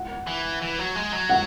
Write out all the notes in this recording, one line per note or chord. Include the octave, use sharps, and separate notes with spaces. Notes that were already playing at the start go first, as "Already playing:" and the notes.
Already playing: F#5
E3
E3
F#3
G#3
F#3
F#5